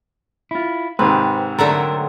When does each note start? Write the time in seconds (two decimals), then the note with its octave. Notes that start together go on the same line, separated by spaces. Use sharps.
0.51 E4 F4
0.99 G#2 C3 D#3 C4 B4
1.59 D3 F#3 A3 A4 A#4